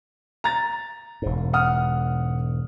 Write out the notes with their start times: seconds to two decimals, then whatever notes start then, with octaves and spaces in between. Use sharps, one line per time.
0.44 A#5 A6
1.22 E1 G#2
1.53 F#5 D#6 F6